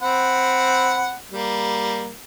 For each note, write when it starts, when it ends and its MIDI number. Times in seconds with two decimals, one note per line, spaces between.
0.02 1.15 60
0.02 1.15 78
0.02 1.15 83
1.32 2.12 55
1.32 2.12 58